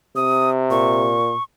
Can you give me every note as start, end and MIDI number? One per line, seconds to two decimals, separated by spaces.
0.16 1.17 48
0.16 0.50 87
0.71 1.34 46
0.71 1.43 85